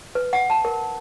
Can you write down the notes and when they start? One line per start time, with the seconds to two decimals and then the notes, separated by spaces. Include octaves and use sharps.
0.15 B4
0.33 F#5
0.50 A5
0.65 A#4